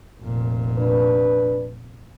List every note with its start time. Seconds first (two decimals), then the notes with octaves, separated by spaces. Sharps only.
0.23 F1 A#2
0.78 D4 B4